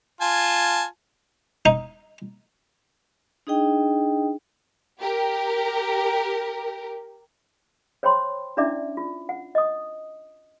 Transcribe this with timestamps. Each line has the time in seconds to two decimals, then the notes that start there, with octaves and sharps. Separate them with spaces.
0.21 F4 G#5 A5
1.66 D#4
3.47 D4 D#4 G#4 D#5 G5
5.00 G4 A#4
8.03 C5 C#5 G5 B5 C6
8.57 C#4 D4 E4 D5 E5 D6
8.97 F4
9.29 F#5
9.55 D#5 D#6